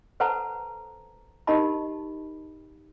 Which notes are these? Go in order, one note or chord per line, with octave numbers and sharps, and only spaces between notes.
A4 B4 C5 F#5 A5 A#5
D#4 G4 A#4 D#5 A5 B5